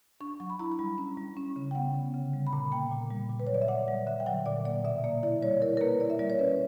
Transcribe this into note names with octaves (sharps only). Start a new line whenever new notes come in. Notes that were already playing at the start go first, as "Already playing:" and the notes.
D4 C#6
F#3 C#6
B5
E4 A#5
B5
G3 A#5
C#4
G3
C#4
C#3
G5
B3 F#5
D3
C#3
G3
B5
A#2 A#5
A#3 G5
A#2
G3
A#2
B4
F#3 C#5
D5
E5
A#2 F#5
G3 F#5
D3 E5
G5
F#3 F#5
A#2 D5
A#3 D5
B2 E5
A#3 D5
E4 D5
G3 C#5
E4 A#4
A#4
A#3 B4
E4 D5
E5
G3 D5
C#5
C#4 B4